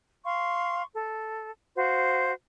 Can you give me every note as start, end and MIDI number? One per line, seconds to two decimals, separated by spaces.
0.24 0.84 77
0.24 0.84 84
0.24 0.84 85
0.94 1.51 69
1.75 2.32 66
1.75 2.32 72
1.75 2.32 77